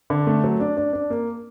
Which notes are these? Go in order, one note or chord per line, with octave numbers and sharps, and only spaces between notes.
D3
A3
F#3
D4
D4
D4
A#3